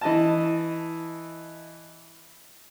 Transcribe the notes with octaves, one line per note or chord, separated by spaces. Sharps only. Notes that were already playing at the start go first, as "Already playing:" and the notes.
E3 D#5 A5